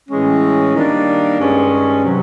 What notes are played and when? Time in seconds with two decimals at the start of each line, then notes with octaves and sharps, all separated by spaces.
0.09 A2 E3 G#3 C#4
0.75 D#3 G3 A#3 D4
1.39 G2 D#3 G#3 C#4
2.04 C3 D#3 F#3